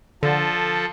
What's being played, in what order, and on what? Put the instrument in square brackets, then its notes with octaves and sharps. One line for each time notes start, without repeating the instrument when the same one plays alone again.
[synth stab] D3 [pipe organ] F3 A4